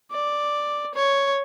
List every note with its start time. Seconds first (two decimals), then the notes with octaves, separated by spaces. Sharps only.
0.11 D5
0.94 C#5